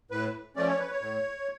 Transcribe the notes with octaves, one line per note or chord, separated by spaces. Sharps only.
A2 B4
F3 A3 C#4 D5
C#5
B4
C#5
A2